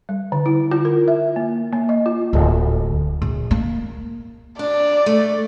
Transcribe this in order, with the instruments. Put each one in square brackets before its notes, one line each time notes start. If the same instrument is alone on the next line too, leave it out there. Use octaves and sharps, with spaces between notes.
[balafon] G3
D3
E4
F4
A#4
E5
A#3
A#3
D#5
F4
[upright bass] D1
A#1
A#3
[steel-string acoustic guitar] D4 [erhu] D5
[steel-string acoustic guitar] A3